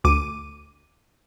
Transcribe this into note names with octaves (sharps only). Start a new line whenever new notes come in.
D2 D6 D#7